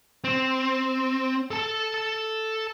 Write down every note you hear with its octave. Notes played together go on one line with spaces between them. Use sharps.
C4
A4 A5